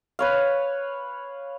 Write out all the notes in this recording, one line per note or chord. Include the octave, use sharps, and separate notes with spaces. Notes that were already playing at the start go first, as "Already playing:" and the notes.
B4 C#5 F5